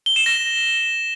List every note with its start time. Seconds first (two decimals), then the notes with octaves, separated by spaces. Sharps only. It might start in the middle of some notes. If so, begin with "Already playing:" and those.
0.06 G7
0.16 E7
0.26 A#6